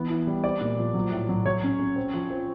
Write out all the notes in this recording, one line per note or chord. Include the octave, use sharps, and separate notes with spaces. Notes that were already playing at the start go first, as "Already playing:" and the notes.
Already playing: E3 B3
E4
G3
C4 D5
A#2
F3
F#3
A2
F#3
F#3 C#5
C#4
C#4
C4
F3
C4